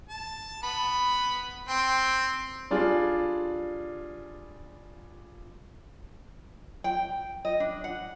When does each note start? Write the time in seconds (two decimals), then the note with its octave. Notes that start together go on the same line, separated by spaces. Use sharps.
0.09 A5
0.63 B3 B5
1.69 C4 G5
2.71 G3 D4 F4 G#4
6.84 G5
7.45 D#5
7.60 D4
7.84 F#5